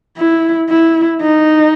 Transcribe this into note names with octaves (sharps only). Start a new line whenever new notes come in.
E4
E4
D#4